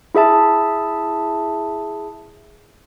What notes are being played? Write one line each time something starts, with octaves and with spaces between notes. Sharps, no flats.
E4 G#4 E5 A5